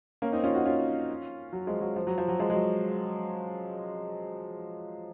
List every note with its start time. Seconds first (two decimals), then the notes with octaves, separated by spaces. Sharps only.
0.22 A#3 C#4
0.32 C4 D#4
0.44 C#4 F4
0.55 D#4 F#4
0.65 C#4 F4
1.53 F#3
1.67 F3 G#3
1.81 F#3
1.96 F3
2.07 F#3
2.18 F3
2.28 F#3
2.39 F3 G#3
2.50 G#3
2.54 F#3